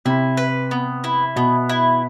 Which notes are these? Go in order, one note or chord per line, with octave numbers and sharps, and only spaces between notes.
C3 E4
B4
B3
E4
B2 B3
E4